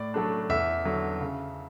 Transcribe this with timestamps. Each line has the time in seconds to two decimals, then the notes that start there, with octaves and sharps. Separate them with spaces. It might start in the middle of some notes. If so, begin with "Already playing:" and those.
Already playing: A2 D5
0.14 F#3 A3 D4
0.49 E2 E5
0.85 D3 F#3
1.20 C#3